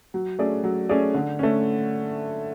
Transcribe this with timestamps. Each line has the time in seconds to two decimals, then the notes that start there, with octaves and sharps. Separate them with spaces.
0.14 F#3
0.39 A3 C#4 G#4 D5
0.64 F#3
0.89 A3 C#4 G#4 D5
1.14 D3
1.39 A3 C#4